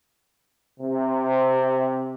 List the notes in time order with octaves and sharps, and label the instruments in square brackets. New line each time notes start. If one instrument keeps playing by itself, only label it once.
[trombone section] C3